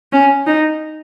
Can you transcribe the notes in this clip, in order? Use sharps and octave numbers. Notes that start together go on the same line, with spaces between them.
C#4
D#4